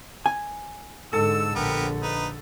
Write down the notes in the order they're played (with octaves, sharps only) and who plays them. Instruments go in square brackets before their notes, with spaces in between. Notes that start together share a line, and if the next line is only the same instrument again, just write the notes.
[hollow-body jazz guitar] G#5
[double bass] G#2 D3 [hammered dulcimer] A4 [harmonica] E6
[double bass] A#1 D3 [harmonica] B3 G4 A#4
[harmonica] D#4 B4